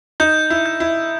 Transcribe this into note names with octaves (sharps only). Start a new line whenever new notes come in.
D#4 G6
E4
G6
E4